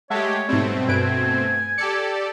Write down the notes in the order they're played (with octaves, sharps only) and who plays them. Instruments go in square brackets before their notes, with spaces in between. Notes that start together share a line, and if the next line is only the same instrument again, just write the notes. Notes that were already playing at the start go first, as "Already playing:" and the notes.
[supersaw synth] G#3 A3 G4 [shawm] C#5 [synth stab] E5 F#5 A5
[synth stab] G#2 G3 [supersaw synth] B2 A3 C4
[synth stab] G2 B4 D7 [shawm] G#5
[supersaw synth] G4 A4 D5 [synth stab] C#7